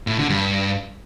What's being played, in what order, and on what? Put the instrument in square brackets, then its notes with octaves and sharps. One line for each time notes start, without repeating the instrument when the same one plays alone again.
[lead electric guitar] A2
D3
G2